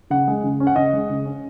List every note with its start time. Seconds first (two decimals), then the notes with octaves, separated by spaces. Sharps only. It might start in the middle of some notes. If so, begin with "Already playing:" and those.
0.10 C#3 F#5
0.28 G#3
0.43 C#3
0.60 C#4
0.67 F#5
0.76 C#3 D#5
0.93 G#3
1.10 C#3
1.25 C#4